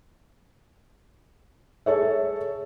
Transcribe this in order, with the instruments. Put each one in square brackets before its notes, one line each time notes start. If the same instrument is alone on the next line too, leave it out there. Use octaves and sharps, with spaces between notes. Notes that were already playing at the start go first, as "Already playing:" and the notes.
[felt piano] G#4 A4 C#5 E5